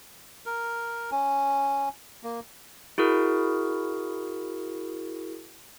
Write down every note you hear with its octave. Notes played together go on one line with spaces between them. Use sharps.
A#4
C#4
A#3
E4 F#4 G#4 A#4